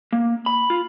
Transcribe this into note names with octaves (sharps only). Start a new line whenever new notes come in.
A#3
B5
F4